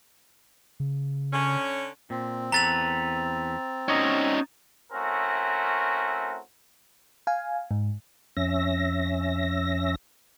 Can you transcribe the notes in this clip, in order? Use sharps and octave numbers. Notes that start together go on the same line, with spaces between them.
C#3
D3 C#4
A#2 C4
E2 A4 B4 A#5 A6 F7
C#4 D#4 F#4 C#5 D#5
A3 C4 C#4 E4 F#4 A#4
F5 G#5
G#2
F2 C#4 E5 A#6